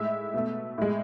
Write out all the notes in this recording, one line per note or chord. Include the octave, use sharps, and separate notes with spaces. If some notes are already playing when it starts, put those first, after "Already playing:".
Already playing: A2 G#3 E5
B2 A3
A2 G#3